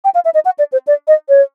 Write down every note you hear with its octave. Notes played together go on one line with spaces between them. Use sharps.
G5
F5
E5
D#5
F#5
D5
C5
D5
D#5
C#5